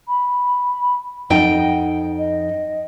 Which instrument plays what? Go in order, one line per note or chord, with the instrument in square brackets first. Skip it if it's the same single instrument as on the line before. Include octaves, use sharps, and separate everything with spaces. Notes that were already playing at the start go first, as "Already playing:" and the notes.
[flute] B5
[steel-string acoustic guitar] F2 D#4 G5 [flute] F#5
[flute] D#5